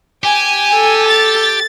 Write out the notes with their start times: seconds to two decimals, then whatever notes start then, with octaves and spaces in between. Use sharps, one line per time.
0.24 G4 G#5
0.74 A4
1.08 A6